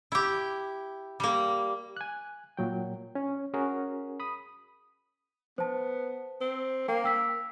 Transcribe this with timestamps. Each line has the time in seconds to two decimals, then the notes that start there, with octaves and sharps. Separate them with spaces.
0.12 E4 G4
1.20 G3 A#3
1.97 G#5 F#6
2.57 A#2 F#3 G5
3.15 C#4
3.54 C#4 F#4 G#4 A#4
4.20 B5 D#6
5.58 B3 C5 A5
6.41 C4
6.88 A#3 G5
7.04 G5 E6 B6